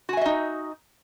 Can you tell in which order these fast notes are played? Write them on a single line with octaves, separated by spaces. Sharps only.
F#4 G#5 E5 D#5 D#4